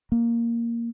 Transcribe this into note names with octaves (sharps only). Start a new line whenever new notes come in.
A#3